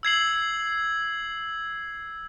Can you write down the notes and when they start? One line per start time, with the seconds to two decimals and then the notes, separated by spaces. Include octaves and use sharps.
0.03 E6 G#6 C7 F#7